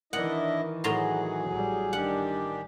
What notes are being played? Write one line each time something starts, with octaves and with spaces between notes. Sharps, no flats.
D#3 E3 D4 E4 A#4 D#5 F#5
A2 F#3 G#4 F#5 A#5 C6
A1 G3 G#5
D#3 D4 G4 F#5